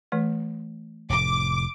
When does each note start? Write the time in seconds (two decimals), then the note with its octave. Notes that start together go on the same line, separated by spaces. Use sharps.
0.12 E3 A3 B4
1.10 F1 A2 D6